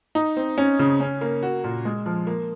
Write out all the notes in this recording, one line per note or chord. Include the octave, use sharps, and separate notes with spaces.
D#4
C4
C#4
C#3
C#4
A#3
F#4
A#2
G#3
F3
A#3